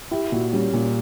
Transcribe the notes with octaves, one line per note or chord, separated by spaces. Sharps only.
E4 G4
A#2 F#4
G3 C#4
A#2